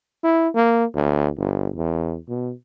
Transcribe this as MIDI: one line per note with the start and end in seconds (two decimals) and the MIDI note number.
0.23 0.49 64
0.55 0.85 58
0.94 1.29 38
1.37 1.69 31
1.75 2.17 40
2.29 2.53 47